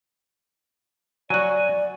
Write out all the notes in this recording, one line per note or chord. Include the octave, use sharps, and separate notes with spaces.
F#3 F#4 D5 G#5